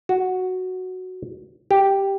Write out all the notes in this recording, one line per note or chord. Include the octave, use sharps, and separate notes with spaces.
F#4
G4